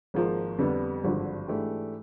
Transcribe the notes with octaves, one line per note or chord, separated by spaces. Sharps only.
G#1 G#2 F3 A#3
F2 D3 G3 B3 D4
G#1 G2 D3 F3
G#2 E3 A3 D4 G4